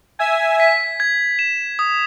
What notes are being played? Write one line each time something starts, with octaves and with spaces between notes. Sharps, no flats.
E5 G#5 G#6
B6
G#6
E7
D#6